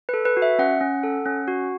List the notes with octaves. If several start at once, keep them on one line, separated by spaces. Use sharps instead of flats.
A4 B4
B4
F#4
E5
C#4 F#5
C#4
A4
C#4
F#4